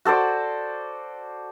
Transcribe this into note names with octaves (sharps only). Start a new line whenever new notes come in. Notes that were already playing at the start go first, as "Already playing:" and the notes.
F#4 A4 C5 D5